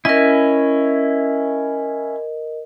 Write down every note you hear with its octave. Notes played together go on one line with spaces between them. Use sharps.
C#4 E4 A#4 D#5